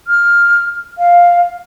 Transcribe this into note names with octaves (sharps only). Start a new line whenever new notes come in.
F6
F5